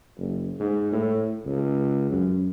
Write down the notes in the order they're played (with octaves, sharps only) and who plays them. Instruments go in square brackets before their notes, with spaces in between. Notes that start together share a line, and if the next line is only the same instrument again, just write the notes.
[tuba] F#1
G#2
A2
C#2
F#2